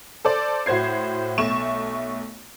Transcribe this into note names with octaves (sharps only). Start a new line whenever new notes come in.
A4 C5 D5
A2 F#4 C5 G#6 C7
B1 A3 C#6 E7